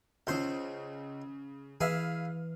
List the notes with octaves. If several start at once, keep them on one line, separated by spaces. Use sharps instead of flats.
C#2 C#3 C5 G6
E3 G#4 B4 E5 F5 F6